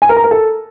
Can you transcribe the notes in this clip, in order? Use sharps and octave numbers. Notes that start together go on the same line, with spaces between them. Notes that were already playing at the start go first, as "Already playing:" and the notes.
G#5
A#4
A#5
A#4
A4